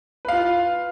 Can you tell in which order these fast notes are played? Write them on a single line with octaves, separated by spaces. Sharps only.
B4 F5 F4